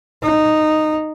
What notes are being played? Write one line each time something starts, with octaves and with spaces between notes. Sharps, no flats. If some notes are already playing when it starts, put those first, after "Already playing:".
D#4